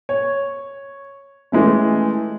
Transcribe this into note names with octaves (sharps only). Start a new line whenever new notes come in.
C#5
E3 G#3 A3 C#4